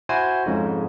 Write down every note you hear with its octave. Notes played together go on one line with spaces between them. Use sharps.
E4 F#4 C5 G#5
F2 G#2 C#3